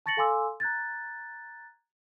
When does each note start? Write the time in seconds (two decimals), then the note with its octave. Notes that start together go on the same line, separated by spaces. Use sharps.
0.06 A5 C#6 A6 A#6 C#7 F#7
0.17 A4 F5 G#5 C6 D6 E6
0.60 A#5 F#6 G#6 A6